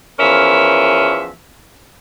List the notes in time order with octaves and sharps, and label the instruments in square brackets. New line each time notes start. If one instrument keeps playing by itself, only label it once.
[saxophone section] E2 F3 C#4 A#4 E5